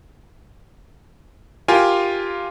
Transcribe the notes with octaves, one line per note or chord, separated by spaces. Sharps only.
F4 G4 A#4 G#5